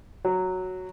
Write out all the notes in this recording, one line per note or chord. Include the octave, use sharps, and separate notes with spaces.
F#3